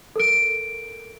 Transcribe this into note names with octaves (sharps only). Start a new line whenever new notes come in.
A4 A#4 D7